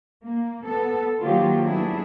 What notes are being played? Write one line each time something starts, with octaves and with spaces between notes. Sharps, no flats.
A#3
B3 A4
D#3 F3 F#3 A#3 F4 G4
F#3 A3 B3 D4 E4 G#4